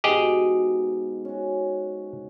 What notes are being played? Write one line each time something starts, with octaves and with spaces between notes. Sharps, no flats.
G#2 B2 G4 G#4 D#5
C#4 F#4